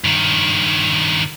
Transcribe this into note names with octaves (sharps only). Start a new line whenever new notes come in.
G2 D#3